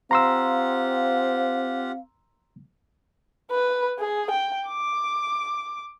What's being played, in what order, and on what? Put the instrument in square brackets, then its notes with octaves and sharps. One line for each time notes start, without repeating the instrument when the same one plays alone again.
[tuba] C4 [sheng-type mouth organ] F4 G4 F#5 [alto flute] F5 [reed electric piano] A#5 C6 E6
[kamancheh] B4
G#4
G5
D6